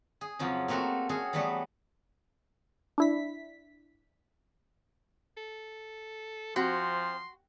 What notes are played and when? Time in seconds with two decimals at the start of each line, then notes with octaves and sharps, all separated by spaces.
0.21 G#4
0.39 F2 C#3 F3 F#3
0.68 A3 A#3 C4 F#4 A4
1.09 C#4 F#4 G#4 A4
1.33 E3 F#3 G3 A3 B3 A4
2.98 D4 E4 B6
5.37 A4
6.56 F3 C4 F#4 C6